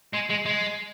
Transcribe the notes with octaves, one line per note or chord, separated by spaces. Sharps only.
G#3
G#3
G#3